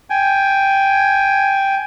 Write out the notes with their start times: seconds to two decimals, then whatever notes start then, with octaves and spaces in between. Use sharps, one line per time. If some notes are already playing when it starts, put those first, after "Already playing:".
0.10 G5 G#5